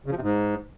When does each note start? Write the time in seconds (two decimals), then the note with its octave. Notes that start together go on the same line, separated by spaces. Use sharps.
0.06 C#3
0.11 F3
0.17 C3
0.22 G#2